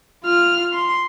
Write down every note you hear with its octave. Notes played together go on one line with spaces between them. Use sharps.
F4 F6
C6